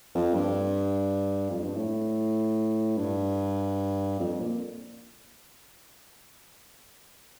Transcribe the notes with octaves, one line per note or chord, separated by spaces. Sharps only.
F2
G2
F2
G2
A2
G2
F2
A#2